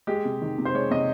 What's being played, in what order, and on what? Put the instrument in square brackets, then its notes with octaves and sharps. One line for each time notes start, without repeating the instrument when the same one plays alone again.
[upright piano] G#3 G4
C3
D#3
C3
C5
G#3 C#5
C3 D#5